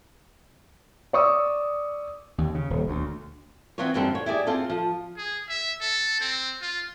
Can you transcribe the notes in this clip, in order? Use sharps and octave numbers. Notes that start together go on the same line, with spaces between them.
D5 C#6 D#6 E6
D#2
C#3
D#1
D2
E3 B3 C4 F4 C#5
F#2 D3 F3 G3 C4
C#5
E4 G4 G#4 D5
C4 F4 G#4 A4
F3
G#4
E5
A4
C4
F4